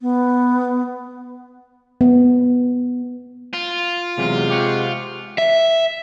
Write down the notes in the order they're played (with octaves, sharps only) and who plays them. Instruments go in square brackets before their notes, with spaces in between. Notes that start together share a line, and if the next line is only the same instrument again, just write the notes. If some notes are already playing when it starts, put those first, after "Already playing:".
[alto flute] B3
[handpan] B3
[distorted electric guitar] F4
[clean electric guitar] E2 F#3 [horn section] C3 G#3
[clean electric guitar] G4 C#5 F#5
[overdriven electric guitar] E5